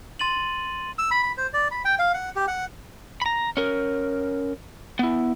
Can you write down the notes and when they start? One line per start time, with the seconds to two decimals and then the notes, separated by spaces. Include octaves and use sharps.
0.19 C6 A6 D#7 F#7
0.99 E6
1.11 B5
1.23 B5
1.37 C5
1.53 D5
1.71 B5
1.85 G5
1.99 F5
2.14 F#5
2.35 G4
2.48 F#5
3.22 A#5 B5
3.57 C#4 A#4
4.99 B3 E4